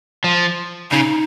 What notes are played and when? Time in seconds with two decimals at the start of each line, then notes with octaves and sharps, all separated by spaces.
0.24 F3
0.91 C#3 D#4